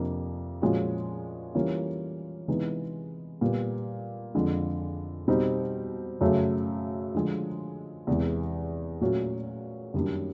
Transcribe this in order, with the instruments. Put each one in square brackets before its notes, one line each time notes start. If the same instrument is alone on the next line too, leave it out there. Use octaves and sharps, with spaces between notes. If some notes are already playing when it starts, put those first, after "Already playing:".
Already playing: [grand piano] F2 C3 F3 A#3 D4
A#2 F3 G#3 C#4 F#4
E3 G3 A#3 C#4 F4
C3 E3 G#3 B3 D#4
A#2 G3 B3
F2 D3 F3 G#3
B2 G3 C4 D#4
F#2 C#3 F#3 A3
D3 F3 G#3
E2 C3 E3 G#3
A#2 F#3 A3 C#4 F#4
F#2 D#3 G3 A#3 D4